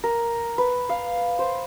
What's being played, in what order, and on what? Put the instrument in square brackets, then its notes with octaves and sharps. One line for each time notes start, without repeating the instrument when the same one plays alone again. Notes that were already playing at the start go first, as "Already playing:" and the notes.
[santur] A#4
B4
F5
C5